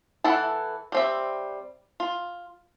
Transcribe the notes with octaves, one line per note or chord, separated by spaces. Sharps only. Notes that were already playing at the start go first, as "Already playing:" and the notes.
E3 E4 A4 F#5 A5
G3 C4 E5
F4